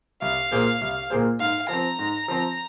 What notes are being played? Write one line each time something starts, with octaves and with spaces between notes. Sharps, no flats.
C2 F5
A#2 A#3 G#4 C5
C2
A#2 A#3 G#4 C5
G#2 F5
F3 C4 A#5
G#2
F3 C4